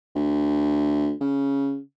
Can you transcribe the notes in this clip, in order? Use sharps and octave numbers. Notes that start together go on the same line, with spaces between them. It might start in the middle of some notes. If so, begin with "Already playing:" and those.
D2
C#3